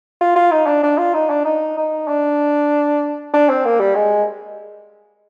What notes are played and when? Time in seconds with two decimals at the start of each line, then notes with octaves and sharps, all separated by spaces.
0.21 F4
0.36 F4
0.51 D#4
0.67 D4
0.83 D4
0.98 F4
1.14 D#4
1.30 D4
1.45 D#4
1.77 D#4
2.08 D4
3.34 D4
3.49 C4
3.65 A#3
3.80 G3
3.95 G#3